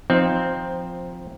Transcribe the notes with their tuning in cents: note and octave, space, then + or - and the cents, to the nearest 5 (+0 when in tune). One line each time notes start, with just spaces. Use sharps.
F3 +10 C4 +0 D#4 +0